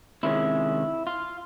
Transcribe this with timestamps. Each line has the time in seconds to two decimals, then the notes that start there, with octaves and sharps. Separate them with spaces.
0.23 C3 D#3 G#3 C#4 E4
1.07 F4